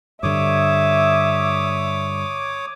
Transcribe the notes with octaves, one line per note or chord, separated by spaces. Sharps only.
G2 D3 C#5 E5 D6 D#6